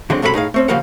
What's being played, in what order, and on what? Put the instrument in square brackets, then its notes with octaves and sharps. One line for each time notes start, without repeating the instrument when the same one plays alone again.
[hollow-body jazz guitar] D3 F#3 G#3 C4
F#2 C3 G#3 A4 A#4 B5
A2 D#4 G#4 F5
A3 C4 C#4
C#3 F3 G3 A#3 F5 F#5